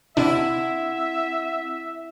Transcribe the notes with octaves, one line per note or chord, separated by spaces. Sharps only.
C3 C4 D4 E4 E5 F#5